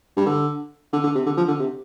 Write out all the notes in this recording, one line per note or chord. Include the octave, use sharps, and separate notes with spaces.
G2
D3
D3
D3
C3
D3
F3
D3
C3